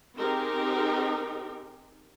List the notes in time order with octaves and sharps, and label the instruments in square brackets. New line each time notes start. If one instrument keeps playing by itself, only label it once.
[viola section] C4 D#4 G4 G#4 A#4